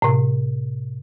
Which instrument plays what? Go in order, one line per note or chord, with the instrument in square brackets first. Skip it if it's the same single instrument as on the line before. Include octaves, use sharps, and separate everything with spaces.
[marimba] A2 C3